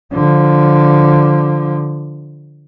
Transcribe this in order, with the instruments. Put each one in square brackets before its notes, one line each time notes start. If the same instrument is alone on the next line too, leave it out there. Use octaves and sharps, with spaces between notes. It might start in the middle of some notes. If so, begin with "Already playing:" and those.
[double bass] D3 F3